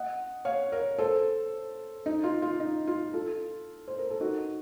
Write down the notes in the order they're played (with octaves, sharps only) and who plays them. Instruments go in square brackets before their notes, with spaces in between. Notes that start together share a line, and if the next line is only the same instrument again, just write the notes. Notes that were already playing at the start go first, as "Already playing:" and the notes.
Already playing: [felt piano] D#5 F#5
C#5 F5
A#4 C#5
A4 C5
D#4
F4
F4
D#4
F4
F4 A4
C5
A#4
A4
D#4 F#4